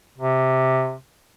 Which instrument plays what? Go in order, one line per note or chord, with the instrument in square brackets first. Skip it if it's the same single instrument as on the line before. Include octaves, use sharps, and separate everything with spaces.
[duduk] C3